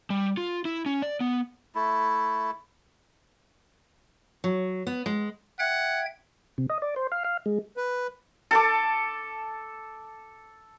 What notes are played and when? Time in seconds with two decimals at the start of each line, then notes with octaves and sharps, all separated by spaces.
0.10 G3
0.37 F4
0.65 E4
0.86 C#4
1.02 D5
1.20 B3
1.75 A3 E4
4.44 F#3
4.87 B3
5.06 G#3
5.59 E5 F#5 G5 G#6
6.58 C3
6.70 D#5
6.82 D5
6.96 C5
7.12 F5
7.24 F5
7.46 G#3
7.77 B4
8.51 A4 A5 D6